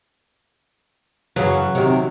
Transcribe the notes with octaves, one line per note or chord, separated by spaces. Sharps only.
F#2 C#3 E3 F#3
C3 D#3